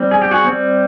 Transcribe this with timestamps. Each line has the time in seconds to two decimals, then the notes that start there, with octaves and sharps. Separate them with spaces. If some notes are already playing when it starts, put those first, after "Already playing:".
Already playing: G3 C4
0.11 G#4
0.22 G4
0.31 F#4 G#4
0.45 G3 C4